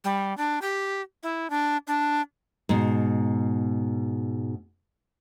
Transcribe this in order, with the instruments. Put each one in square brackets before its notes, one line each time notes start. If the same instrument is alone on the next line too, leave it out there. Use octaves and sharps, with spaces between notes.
[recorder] G3
D4
G4
E4
D4
D4
[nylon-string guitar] G#2 B2